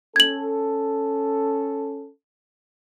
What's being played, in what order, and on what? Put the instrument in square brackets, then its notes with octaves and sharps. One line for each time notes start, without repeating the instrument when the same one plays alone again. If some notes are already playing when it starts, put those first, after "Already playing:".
[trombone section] C#4 A4 [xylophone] G#6 F#7